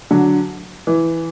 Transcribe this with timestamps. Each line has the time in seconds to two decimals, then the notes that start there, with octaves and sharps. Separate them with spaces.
0.11 D3 F#3
0.87 E3